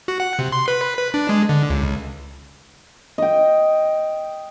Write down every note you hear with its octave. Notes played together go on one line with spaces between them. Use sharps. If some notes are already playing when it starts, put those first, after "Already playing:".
F#4
F#5
C3
C6
B4
B4
D4
G#3
D3
C#2
D#5 G5